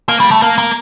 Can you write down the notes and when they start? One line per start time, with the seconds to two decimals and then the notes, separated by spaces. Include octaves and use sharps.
0.09 A#3
0.20 G3
0.31 A3
0.42 A#3
0.58 A#3